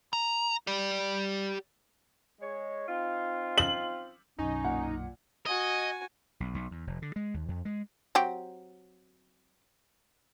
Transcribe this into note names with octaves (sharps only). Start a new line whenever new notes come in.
A#5
G4 D5
G#3 C#5
C4 D#4 F4
F#7
B1 F#2 C#4 D#4
A#2 F#5
F#4 D#5 G#5
B1
B1
E2
F1
D3
G#3
D#2
F2
G#3
F#3 C4 G4